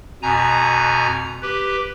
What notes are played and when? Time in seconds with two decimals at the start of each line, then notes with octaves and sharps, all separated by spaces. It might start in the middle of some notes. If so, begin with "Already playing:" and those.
0.22 F2 B2 G#5 A#5
1.42 G4 B4